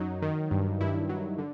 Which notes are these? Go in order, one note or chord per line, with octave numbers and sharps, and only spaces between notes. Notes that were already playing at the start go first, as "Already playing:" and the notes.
Already playing: F#2 F#3 D#4
D#3
G2
G2 E4
F#3
D3